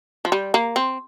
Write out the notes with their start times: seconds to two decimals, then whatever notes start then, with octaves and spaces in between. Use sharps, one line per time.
0.25 F3
0.32 G3
0.54 A#3
0.76 C4